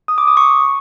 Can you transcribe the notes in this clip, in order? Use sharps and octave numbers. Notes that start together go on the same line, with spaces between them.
D#6
D6
D#6
C#6